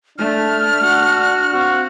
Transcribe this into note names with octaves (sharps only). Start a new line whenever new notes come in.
A3 D4 F6
F#4 F#5
C4 F#4 F5